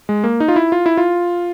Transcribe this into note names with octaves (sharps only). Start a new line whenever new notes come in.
G#3
A#3
D#4
F4
E4
F4
E4
F4